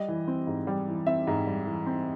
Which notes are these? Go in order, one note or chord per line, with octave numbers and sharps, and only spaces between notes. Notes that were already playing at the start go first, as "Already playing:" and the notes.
Already playing: G3 D#5
E3
C4
G#2
G3
E3
C4 E5
G#2
G3
E3
C4